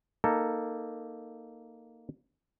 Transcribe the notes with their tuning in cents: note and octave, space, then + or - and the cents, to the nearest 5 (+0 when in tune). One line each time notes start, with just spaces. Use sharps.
A#3 +0 D#4 +0 A4 +10